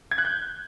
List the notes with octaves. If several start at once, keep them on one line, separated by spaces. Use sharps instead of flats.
G#6
F#6
G6